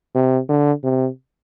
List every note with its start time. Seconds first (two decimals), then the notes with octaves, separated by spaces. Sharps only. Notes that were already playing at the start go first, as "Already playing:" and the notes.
0.15 C3
0.49 D3
0.84 C3